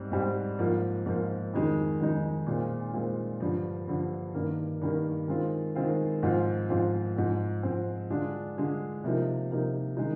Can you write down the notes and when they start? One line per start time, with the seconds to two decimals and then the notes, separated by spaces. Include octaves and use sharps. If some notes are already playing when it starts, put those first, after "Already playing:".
Already playing: G#2 G3 C4
0.12 G#2 G3 C4
0.59 G#2 F3 A#3 F4
1.06 G#2 F3 A#3 F4
1.54 F2 D#3 G#3 D#4
2.00 F2 D#3 G#3 D#4
2.46 A#2 G#3 C4 F4
2.94 A#2 G#3 C4 F4
3.40 G2 D3 F3
3.88 G2 D3 F3
4.34 G2 D#3 A#3
4.81 G2 D#3 A#3
5.28 D#3 G#3 C4 F4
5.75 D#3 G#3 C4 F4
6.23 G#2 F3 C4 F4
6.69 G#2 F3 C4 F4
7.16 G#2 F3 C4
7.63 G#2 F3 C4
8.10 D3 G#3 D4 F4
8.57 D3 G#3 D4 F4
9.04 C3 F3 A#3 D#4
9.51 C3 F3 A#3 D#4
9.97 D#3 G#3 D#4